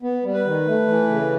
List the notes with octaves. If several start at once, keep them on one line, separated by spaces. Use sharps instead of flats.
B3
G3
B4
D#3
A3
E3
C#3